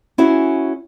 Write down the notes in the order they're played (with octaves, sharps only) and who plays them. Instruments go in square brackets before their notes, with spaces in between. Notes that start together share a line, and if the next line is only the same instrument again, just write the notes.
[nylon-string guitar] C#4 E4 F#4 G#4